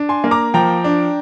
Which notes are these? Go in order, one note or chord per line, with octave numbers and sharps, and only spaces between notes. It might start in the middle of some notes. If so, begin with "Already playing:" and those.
Already playing: D4
G#5 C6
A#3
A#5 D6
F3 G5 A#5
D4